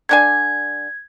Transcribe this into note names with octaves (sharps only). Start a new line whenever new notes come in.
D3 D4 G#5 G#6